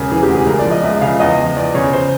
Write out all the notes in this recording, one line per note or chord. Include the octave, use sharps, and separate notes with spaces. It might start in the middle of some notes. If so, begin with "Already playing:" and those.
Already playing: E1 C#3 A#4
E3 G#4
G4
D2
G#4
C#2 A#4
D5
F3
D#5
C#2 E5
C#3 F5
E2 D#5
F3
E2 D5
C#3 C#5
C5